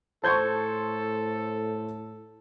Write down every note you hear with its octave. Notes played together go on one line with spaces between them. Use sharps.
A2 A4 C5 A5 C6 C#6 G6 G#6